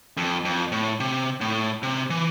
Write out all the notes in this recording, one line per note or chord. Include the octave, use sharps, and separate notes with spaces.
F2
F2
A2
C3
A2
C3
E3